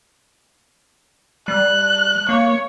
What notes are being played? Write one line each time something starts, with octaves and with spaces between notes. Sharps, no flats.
G3 F#6
A#3 C#5